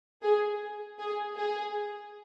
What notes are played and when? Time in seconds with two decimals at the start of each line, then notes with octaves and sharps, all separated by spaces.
0.22 G#4
0.99 G#4
1.37 G#4